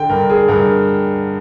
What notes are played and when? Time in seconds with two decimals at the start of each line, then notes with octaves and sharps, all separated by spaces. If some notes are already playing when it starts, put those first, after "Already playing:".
Already playing: D3 G5
0.09 G2 A#4
0.30 G#4
0.48 G2 A#4